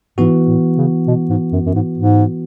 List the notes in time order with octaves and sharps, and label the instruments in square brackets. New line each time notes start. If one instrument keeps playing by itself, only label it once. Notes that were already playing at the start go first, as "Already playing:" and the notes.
[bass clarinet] G#2 [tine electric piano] E3 B3 F#4
[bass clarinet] A2
C#3
B2
G#2
F#2
F#2
G#2
G#2